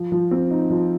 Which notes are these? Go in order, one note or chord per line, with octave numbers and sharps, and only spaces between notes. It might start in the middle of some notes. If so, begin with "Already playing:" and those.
Already playing: F3
F3
C4
D#4
F3